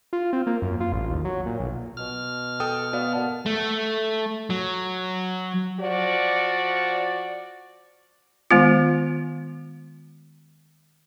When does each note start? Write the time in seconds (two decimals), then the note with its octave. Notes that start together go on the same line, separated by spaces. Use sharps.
0.13 F4
0.33 C4
0.47 A#3
0.62 F#2
0.80 F4
0.92 A1
1.10 D#2
1.25 F#3
1.46 A#2
1.60 B1
1.97 B2 F6
2.60 A4 G5 D#6
2.93 B3 F#4 D5 F5
3.13 A#4 F#5 A5
3.46 A3
4.50 F#3
5.80 F3 F#4 D5
8.51 D#3 G#3 B3 F4